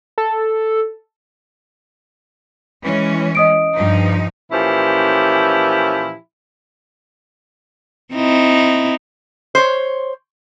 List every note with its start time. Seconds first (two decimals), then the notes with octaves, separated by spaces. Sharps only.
0.18 A4
2.83 E3 G#3 C#4
3.35 D#5 D#6 D7
3.73 G2 F3 D#4
4.51 A#2 E3 F3 C#4 E4 G4
8.14 C4 D#4 E4
9.55 C5 C#5